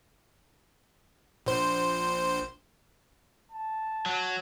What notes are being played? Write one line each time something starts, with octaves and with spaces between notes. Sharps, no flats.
A#1 C5
A5
F#3